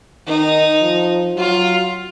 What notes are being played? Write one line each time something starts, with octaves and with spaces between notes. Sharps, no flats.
D#3 D#4
F3
F#3 F4